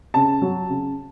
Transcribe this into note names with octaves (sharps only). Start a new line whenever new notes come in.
C#3 A5
F#3
C#3